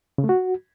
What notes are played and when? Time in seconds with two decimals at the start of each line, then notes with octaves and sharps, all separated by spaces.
0.18 C#3
0.24 A3
0.29 F#4